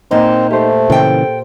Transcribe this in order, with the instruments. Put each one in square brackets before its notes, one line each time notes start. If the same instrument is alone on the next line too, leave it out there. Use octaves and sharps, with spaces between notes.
[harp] A#2 A#3 E7 [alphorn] C4 [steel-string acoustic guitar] D#4
[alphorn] A3 [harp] G4 C5
[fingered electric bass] A#2 C#3 E3 [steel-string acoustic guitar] A4 G5